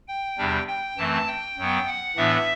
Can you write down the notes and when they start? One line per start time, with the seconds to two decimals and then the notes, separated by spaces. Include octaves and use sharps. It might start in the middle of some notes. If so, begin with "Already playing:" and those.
0.08 G5
0.37 E2 C3 G3 D4
0.68 G5
0.98 F#2 E3 A3 C4 A5
1.28 G5
1.58 F#2 F#3 B3
1.87 F#5
2.16 A2 E3 B3 D4 E5